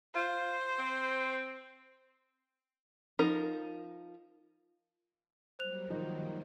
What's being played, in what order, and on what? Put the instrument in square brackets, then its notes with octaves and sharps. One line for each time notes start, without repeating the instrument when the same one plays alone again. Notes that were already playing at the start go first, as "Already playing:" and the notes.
[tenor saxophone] F4 [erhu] C5
[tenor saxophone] C4
[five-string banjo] F3 D#4 A#4
[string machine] F#3 G3 A#3 [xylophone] C5 F#6 F7
[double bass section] D#3 [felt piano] F3 D#4 F#4